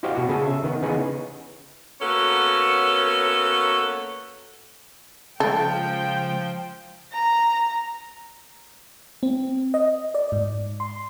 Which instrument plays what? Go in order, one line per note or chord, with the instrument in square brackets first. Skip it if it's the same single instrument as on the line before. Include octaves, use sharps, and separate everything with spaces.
[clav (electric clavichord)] E4 F#4 G4 C5 D#5 F5
B2 F#4
C#3 G#4 A4
E5
D#3 B3
C#3 E3 B3 D#4 G#4
[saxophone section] A#3 B3 C#4 F#4 A4
[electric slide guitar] C#3 G#3 [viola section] F3 G5 [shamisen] A4
[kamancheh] A#5
[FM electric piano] C4
D#5
D5
G#2
C6